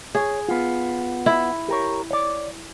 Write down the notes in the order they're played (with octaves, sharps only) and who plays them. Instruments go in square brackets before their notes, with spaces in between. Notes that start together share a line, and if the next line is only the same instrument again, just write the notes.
[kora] G#4 [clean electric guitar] C#5
[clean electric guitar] B3 F4
[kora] E4
[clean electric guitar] G4 A#4 C#5
C#5 D5